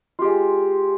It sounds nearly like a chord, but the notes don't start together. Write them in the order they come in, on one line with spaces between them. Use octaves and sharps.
F4 G4 G#3